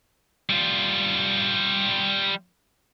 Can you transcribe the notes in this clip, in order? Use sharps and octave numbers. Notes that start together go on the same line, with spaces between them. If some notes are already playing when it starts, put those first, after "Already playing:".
G3 F4